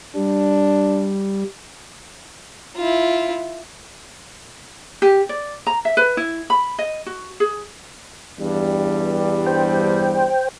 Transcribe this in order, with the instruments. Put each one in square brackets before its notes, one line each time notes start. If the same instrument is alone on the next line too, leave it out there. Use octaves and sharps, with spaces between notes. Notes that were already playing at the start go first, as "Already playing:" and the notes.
[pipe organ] G3 [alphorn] D4
[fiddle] E4 F4
[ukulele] G4
D5
A#5
E5
B4
E4
B5
D#5
F#4
G#4
[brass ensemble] E2 G2 G3
[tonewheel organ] C5 G5